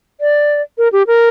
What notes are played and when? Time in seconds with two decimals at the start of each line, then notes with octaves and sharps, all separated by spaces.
0.21 D5
0.78 A#4
0.93 G4
1.07 A#4